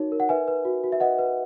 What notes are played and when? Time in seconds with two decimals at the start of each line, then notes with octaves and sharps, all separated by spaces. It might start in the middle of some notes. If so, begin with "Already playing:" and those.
Already playing: D#4 F#4 A#4 C#5
0.12 A#4
0.20 F#5
0.29 B4 E5 G#5
0.48 B4
0.65 F#4
0.84 F#4
0.92 E5
1.00 B4 D#5 F#5
1.19 B4